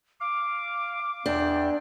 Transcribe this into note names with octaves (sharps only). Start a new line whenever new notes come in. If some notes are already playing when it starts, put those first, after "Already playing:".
F5 D6
E2 D4 G5